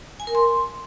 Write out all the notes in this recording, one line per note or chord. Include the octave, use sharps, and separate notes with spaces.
G#5
A#4
C6